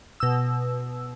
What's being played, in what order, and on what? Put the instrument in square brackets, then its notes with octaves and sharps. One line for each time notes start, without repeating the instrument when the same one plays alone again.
[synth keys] B2 E6